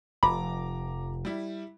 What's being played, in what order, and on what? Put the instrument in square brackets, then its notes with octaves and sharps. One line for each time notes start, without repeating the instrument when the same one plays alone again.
[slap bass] F1 F3 [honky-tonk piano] A#5 D6 [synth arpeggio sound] B5
[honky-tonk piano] G3 E4